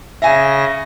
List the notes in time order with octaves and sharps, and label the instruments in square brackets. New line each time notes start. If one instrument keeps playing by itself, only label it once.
[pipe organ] C#3 A#6 [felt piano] E5 G#5